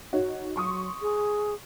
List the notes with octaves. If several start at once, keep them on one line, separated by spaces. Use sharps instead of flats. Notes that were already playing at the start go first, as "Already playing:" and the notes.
D#4 F#4 C#5
F#3 C6 C#6 D#6
G#4